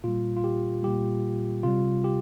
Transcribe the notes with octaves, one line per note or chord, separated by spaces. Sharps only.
A#2 G3 F4
F4
G4
A#2 G3 G4
C3 G3 F4
G4